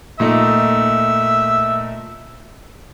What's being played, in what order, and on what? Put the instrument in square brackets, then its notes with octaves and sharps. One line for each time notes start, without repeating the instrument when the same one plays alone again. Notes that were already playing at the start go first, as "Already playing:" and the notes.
[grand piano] A#2 A3 D#4 [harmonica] E5